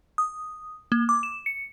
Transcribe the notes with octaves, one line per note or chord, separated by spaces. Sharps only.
D#6
A#3
D6
E7
C#7